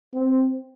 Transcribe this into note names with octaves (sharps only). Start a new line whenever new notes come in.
C4